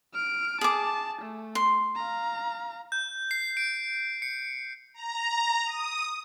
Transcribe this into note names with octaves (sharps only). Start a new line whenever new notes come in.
F6 D7
G#4 A5 D6
A3
C6
F5 A#5
G6
C7
D7
C#7
A#5
D#6